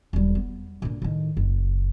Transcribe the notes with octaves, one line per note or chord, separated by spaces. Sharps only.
E1 G3
B3
A#2 D3
A2 D#3
F#1